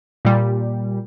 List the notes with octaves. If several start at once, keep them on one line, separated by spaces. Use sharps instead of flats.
A#2 G3